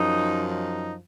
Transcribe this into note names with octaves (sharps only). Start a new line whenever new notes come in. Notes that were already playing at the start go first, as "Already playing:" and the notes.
Already playing: F#2 F3 D#4
D#4